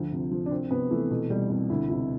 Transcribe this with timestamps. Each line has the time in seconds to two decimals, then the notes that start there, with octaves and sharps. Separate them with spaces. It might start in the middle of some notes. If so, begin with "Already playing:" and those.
Already playing: D2 F3
0.12 C3
0.31 F3
0.46 D4
0.51 C2 C4
0.71 C3 B3
0.90 E3 A3
1.11 B2 A3
1.30 B2 G3
1.50 C2 G3
1.70 D2 E4
1.90 C3 E4